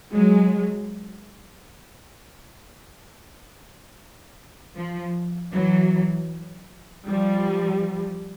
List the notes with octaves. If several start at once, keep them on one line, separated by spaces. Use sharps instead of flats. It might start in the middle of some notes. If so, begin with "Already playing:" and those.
F#3 G#3
F3
E3 F#3
F3 G3